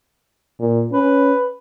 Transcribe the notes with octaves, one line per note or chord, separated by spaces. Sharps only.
A#2
C#4 B4